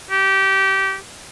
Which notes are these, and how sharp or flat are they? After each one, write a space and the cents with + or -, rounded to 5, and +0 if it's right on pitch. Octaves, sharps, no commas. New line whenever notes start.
G4 -20